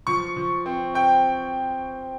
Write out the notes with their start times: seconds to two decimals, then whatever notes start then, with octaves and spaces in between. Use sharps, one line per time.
0.07 F3 C#6
0.37 F3
0.66 C4
0.94 C4 G5